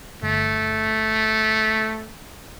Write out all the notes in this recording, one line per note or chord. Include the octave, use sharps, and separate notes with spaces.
G1 A3